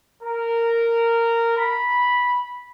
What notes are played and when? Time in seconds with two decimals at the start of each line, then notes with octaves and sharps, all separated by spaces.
0.22 A#4
1.57 B5